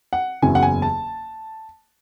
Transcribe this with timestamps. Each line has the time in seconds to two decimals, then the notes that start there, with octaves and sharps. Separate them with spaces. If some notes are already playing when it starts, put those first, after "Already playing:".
0.13 F#5
0.42 F#1 E2 C#3 F#3 G#5
0.55 F#5
0.63 G#5
0.82 A5